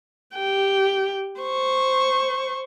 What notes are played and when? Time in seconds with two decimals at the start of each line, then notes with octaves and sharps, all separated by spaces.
0.35 G4 G5
1.41 C5 C#6